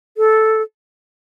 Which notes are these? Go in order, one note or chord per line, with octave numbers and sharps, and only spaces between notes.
A4